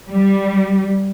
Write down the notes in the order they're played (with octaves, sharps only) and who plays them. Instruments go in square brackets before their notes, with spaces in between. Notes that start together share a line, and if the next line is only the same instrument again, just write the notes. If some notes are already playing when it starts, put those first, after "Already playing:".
[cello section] G3